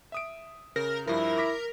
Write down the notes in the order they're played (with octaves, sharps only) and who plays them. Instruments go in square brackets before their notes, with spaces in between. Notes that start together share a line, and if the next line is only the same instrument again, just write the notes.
[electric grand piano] E5 D#6 D7
[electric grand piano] C#3 [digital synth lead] A#4
[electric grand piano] G2 F3 [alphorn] E4 [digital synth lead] A#4
[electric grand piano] D6 A#6 B6